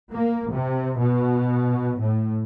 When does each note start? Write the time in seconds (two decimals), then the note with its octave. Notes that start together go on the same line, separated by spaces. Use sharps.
0.13 A#3
0.53 C3
1.00 B2
2.00 A2